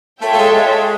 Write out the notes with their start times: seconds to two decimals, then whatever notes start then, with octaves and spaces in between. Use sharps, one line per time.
0.22 A3 F4 A4 C#5 E5 G5
0.33 A3
0.38 G#3
0.53 G#3